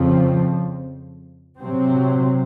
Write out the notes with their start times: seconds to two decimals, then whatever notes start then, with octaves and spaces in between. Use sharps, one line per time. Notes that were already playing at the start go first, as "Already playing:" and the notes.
Already playing: F2 C#3 F3 C4
1.58 C3 F#3 C4